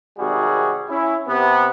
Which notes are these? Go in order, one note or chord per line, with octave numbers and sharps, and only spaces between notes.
G#1 C3 G3 F#4 G#4
C#4 E4
C3 B3